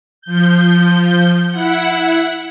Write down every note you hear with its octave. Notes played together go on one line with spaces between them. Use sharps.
F3 G6
E4 F#5